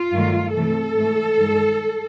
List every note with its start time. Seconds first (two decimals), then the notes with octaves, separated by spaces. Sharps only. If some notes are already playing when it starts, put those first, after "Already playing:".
Already playing: F4
0.12 G2 D#3 F#3 A3
0.55 C3 E3 A3 A4
0.96 G#2 E3 A3
1.39 G2 D#3 G#3